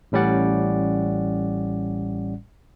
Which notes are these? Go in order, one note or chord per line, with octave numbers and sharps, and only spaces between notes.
A1 A2 G3 C#4 D5 F#5